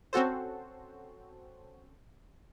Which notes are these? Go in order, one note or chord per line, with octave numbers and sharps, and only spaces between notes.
C4 C#4 F#4 A4 C5